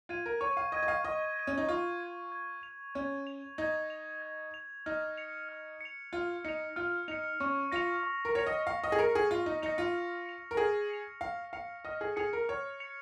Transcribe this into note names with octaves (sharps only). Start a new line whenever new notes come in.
F4 G#6 D#7
A#4
C#5 C#6
F5
D#5 G#6 D#7
D#5
F5
D#5 C#6
G#6 D#7
C#4
D#4
F4 C#6
G#6 D#7
G#6
F7
C#4 G#6
F7
D#4 G#6
F7
G#6
F7
D#4 F6
C#7 F7
F6
C#7 F7
F4 F6
D#4 C#7 F7
F4 F6
D#4 C#7 F7
C#4 C#6
F4 A#6 C#7 F7
C#6
A#4
C#5 A#6 C#7 F7
D#5
F5 C#6
D#5
G#4
A#4 A#6 C#7 F7
G#4
F4 C#6
D#4
D#4 A#6 C#7 F7
F4
F6
C#7 F7
A#4
G#4 F6
C#7 F7
F5 F6
F5 C#7 F7
D#5 F6
G#4
G#4 C#7 F7
A#4
C#5 F6
C#7 F7